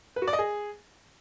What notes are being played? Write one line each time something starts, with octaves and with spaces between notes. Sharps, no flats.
B4
F#4
D5
D#5
G#4